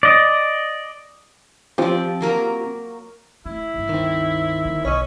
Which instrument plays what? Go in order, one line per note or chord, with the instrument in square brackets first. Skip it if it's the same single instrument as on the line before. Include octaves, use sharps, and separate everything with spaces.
[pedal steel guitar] D5 D#5
[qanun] F3 D5 [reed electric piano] C4 F4 G4
[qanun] F#3 A#3 A#4
[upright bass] A3 [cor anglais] E4
[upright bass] C#2 G2
[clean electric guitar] D#3 C4
[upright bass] D3 A#3
[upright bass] B1 [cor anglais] C#4 [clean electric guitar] C#5 D#5